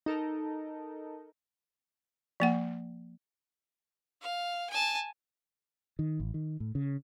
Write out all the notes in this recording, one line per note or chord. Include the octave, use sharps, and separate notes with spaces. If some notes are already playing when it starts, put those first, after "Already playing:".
D#4 A4 A#4
F3 A#3 F#5
F5
G#5 A5
D#3
A1
D#3
A2
C#3